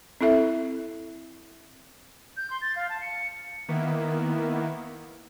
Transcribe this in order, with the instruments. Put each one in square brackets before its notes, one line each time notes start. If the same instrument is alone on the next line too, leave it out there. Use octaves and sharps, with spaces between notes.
[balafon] C4 E4 A4 E5
[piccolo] G6
C6
A6
F5
A5
C#7
[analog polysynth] D#3 A#3 B3 E4